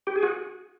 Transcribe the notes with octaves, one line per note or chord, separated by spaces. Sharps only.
G4
G#4
F#4